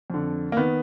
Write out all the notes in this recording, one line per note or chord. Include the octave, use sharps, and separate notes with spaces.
F2 D3
A#3
D#3 B3